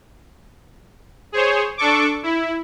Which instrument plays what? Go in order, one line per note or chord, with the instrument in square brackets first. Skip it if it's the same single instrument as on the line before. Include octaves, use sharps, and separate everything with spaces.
[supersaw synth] G#4 C5 C#5
D4 A4 C#6 D6
E4